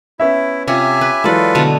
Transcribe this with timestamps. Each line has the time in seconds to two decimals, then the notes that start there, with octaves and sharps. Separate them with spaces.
0.20 B3 C#4 E4 E5
0.68 C3 C#4 F4 G4 E5 G#5
1.01 B4
1.24 E3 F#3 G#3 F4 F#4 A4 B4 D5
1.55 B2 D3 A3